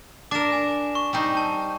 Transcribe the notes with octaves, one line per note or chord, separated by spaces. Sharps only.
D4 A#4 D6 E7
G#5
C#6
G3 C4 D#4
A5